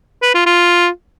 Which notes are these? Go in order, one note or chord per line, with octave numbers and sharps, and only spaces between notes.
B4
F4
F4